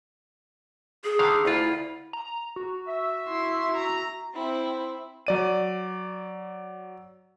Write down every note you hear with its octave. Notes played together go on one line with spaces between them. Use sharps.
G#4
D3 D#3 F5
D2 E4 F4
A#5
F#4
E5
E4 C6
A#5
C4 E4
F#3 D5 D#7